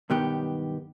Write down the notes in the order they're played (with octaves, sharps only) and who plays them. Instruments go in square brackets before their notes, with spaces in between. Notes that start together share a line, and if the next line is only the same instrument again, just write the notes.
[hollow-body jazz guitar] B1 G2 D#3 B3 G4